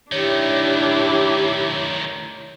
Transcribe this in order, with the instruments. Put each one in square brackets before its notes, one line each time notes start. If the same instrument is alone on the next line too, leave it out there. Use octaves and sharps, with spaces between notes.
[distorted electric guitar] D#3 A3 [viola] D4 E4 [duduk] G4 [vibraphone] C#5